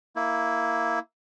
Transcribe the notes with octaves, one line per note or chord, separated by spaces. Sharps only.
A#3 E4